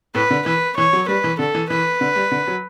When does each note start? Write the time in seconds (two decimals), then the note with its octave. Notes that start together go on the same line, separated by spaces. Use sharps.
0.15 A2 B4
0.31 D3
0.46 E3 B4
0.77 E3 C#5
0.93 F#3
1.08 G3 B4
1.24 E3
1.39 D3 A4
1.55 E3
1.70 E3 B4
2.01 D3
2.16 G3
2.32 D3
2.47 F#3